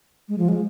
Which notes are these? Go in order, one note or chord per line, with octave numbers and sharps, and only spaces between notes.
G#3
F3
G#3